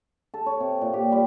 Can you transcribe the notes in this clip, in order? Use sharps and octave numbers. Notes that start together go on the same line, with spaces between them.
A4
C#5
C3
A#2
G4
G3